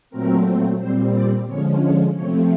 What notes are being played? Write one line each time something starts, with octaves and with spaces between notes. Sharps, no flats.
A#2 F#3 A3 C4 A#4
A#2 G3 C4 C5
D5
D3 F3 G#3 C#4 C#5
C#5
C3 F3 A3 C4 C#5